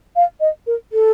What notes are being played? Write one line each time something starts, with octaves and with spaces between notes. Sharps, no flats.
F5
D#5
A#4
A4